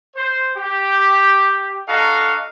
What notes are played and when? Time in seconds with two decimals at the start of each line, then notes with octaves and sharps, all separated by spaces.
0.16 C5
0.56 G4
1.87 D4 F#4 A4 D#5 F5 A#5